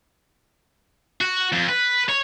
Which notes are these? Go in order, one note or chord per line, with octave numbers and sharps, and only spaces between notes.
F#4
F2
B4
C#5